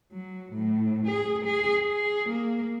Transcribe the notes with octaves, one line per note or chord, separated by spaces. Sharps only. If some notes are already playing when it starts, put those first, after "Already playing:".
F#3
A2
G#4
G#4
G#4
A#3